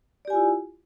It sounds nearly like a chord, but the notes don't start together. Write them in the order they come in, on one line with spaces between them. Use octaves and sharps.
D5 G4 G#5 F4 E4